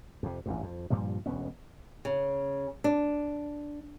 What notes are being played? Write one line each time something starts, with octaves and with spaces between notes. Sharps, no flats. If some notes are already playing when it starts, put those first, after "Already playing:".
F2 C3
A1 E2 G2
F2
G2 A#2 F3 G3
E1 D2 B3 C#4
C#3
D4